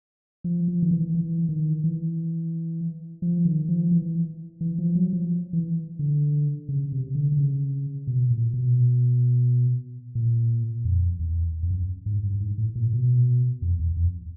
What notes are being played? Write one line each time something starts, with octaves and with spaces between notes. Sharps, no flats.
F3
F3
D#3
E3
E3
D#3
E3
F3
D#3
F3
E3
E3
F3
F#3
F3
E3
D3
C#3
C3
D3
D3
C#3
B2
A#2
B2
A#2
F2
E2
F2
F#2
G#2
G2
G#2
A2
A#2
B2
F2
E2
F2